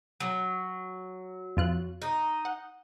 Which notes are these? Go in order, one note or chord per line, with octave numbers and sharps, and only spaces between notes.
F#3
F2 F4 F#6
D#4
F#5